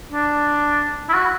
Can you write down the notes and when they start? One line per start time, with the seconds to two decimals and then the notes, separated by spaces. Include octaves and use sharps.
0.12 D4
1.09 E4
1.14 F#4